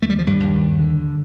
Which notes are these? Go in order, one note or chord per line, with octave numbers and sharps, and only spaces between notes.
D#2 A3
G3
F3
G2 G3
D#2
D3